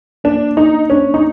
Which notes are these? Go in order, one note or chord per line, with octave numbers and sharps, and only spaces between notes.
A#3 D4
D4 D#4
C#4 D4
D#4